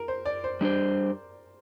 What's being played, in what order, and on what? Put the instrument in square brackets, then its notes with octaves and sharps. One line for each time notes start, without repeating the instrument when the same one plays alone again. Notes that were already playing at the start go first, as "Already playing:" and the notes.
Already playing: [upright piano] A#4
C5
D5
C5
[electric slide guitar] G3 D4 G4 C5